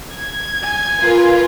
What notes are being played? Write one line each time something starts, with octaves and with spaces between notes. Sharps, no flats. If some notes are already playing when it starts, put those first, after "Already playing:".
G#6
G#5
F4 A#4 B4